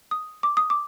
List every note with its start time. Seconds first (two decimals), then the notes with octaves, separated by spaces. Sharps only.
0.11 D#6
0.43 D6
0.57 D#6
0.70 D6